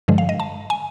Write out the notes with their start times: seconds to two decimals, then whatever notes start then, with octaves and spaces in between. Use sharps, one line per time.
0.08 G2 D3 F3 G#3
0.18 F5
0.29 D#5
0.40 A5
0.70 G#5